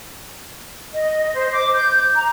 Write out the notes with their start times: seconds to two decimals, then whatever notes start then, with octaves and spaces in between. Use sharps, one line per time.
0.93 D#5
1.34 C5
1.51 D6
1.73 G6
2.15 A#5